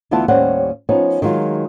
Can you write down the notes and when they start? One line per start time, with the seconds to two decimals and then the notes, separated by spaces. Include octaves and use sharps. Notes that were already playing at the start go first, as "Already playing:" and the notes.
0.11 D2 E3 B3 E4 F4 A5
0.28 D#2 A2 G3 C#4 C5 F#5
0.89 F3 B3 C#4 D#4
1.22 D#3 F#3 G#3 F4